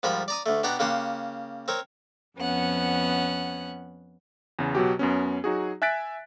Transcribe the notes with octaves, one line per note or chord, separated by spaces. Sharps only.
G#2 F3 G3 A#4 B5
D5 A#5 D#6
D2 A3
B2 D4 G4 F#5 A#5
C#3 A#3 G4 F#5 C6
C4 A#4 C#5
F2 B3 C#4 F#5
E2 C#3
B2 F#3 F#4 G4
F#2 B3 C#4
F#3 D#4 F#4 G#4
E5 G#5 F#6 A6 B6 D7